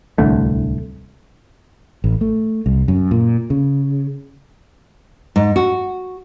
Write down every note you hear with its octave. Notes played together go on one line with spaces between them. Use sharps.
D1 C2 D3 A3
A1
A3
C2
F#2
A#2
C#3
G#2
F#4